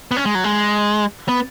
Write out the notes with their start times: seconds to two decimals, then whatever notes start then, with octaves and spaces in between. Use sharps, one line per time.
0.11 B3
0.16 C#4
0.26 G#3
0.35 F#3
0.44 G#3
1.29 B3